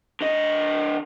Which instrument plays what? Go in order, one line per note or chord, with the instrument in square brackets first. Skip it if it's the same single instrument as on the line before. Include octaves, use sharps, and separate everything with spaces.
[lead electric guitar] D3 D#5